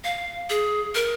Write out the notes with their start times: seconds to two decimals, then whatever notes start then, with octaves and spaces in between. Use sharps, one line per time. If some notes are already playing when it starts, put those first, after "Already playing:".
0.04 F5
0.50 G#4
0.95 A#4